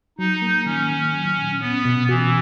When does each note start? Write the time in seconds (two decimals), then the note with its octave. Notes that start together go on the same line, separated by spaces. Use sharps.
0.18 F#3 D#4
0.42 A#3
0.66 D#3 C#4
0.90 D#3
1.14 F#3
1.37 A#2
1.61 B3 C#4
1.85 B2
2.09 E3 F#4